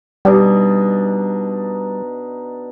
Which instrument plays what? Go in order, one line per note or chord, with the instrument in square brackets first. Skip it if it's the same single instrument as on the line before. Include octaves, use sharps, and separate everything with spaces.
[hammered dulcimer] B2 D4 D#4 [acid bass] G3